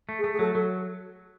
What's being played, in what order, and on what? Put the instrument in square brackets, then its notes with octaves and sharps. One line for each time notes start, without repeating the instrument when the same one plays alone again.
[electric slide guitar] A3
[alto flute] G#4
[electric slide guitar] A3
[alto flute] G#4
[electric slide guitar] F#3 [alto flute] A4
[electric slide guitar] F#3 [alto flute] A4